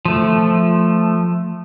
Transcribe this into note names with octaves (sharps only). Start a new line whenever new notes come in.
F3 A3